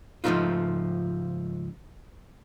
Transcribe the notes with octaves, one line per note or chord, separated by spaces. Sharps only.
C#2 G#2 F3 A3 D#4 F4